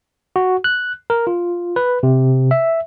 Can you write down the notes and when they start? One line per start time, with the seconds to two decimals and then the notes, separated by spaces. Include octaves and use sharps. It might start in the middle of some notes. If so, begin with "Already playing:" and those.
0.36 F#4
0.64 F#6
1.10 A#4
1.27 F4
1.76 B4
2.03 C3
2.51 E5